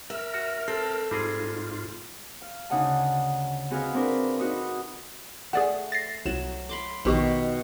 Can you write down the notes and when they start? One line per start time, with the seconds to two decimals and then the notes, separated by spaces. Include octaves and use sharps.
0.10 A#4 E5
0.34 F#4
0.68 C4 A4
1.11 G#2 G3 C4 F4 G#4
2.42 F5
2.70 D2 C#3 D#4 D#5 F#5 A5
3.71 C4 F#4 G#4 B4 D#5 F5
3.94 C4 D4 A#4 B4 F5
4.39 D#4 F#4 B4 D#5
5.53 A3 G#4 D5 F#5
5.92 A6 A#6 C7
6.26 C2 F#3 E7
6.69 B5 C6 D6
7.05 A#1 B2 D#3 G4 C#6